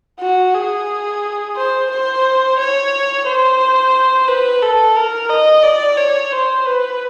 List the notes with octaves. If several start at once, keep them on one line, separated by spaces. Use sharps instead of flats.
F#4
G#4
C5
C5
C#5
C5
B4
A4
A#4
D#5
D5
C#5
C5
B4